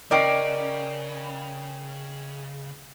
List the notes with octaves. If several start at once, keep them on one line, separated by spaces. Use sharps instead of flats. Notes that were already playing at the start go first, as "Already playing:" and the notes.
C#3 C#4 A#4 D5 D#5 G5 C7